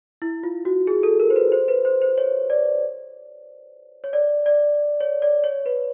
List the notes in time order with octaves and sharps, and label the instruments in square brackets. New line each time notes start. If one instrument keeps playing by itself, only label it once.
[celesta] E4
F4
F#4
G#4
A4
A#4
C5
B4
C5
B4
C5
C5
C#5
D5
C#5
D5
D5
C#5
D5
C#5
B4